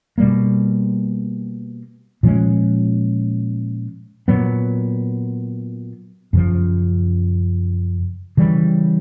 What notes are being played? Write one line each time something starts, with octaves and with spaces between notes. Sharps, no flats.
B2 G3 A#3
A#2 F3 G#3 C#4
A#2 F#3 B3
F#2 C#3 F3
C#3 E3 G3